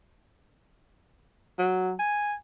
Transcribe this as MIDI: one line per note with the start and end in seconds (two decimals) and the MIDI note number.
1.59 1.93 54
1.99 2.34 80